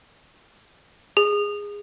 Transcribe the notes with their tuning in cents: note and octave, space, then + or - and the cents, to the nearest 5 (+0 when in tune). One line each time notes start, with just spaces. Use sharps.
G#4 -15